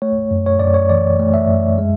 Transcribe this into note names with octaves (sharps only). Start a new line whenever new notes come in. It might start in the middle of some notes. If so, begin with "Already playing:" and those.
A3 C#5
F#2
C#5
F#2 D5
C#5
E3 D5
A3
E5
F#2
G#3